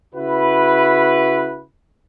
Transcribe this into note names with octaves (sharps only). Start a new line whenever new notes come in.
C#3 E4 F#4 B4